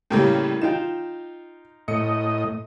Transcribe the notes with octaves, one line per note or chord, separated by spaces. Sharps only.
A2 C#3 G3 A#3 A4 G5
D#4 F4 G5 E7
A2 D#5 C#7